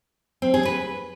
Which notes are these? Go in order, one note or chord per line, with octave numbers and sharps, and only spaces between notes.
C4
G#4
B4